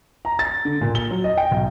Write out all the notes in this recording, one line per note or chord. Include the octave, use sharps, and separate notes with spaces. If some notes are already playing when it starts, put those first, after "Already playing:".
A#5
A6
D3
A#2
G7
F#3
D#5
G5
B1